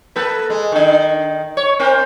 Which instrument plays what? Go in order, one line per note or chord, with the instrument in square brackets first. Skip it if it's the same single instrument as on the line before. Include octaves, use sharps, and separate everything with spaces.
[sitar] A#3 A4 B4
G#3
D#3 D4
C#5
C4 A#4 C5